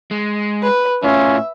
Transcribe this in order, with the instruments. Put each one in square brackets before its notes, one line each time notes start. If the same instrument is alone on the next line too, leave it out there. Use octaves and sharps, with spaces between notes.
[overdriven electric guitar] G#3
[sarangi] B4
[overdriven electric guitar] A2 F4 [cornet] C#4 [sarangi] E5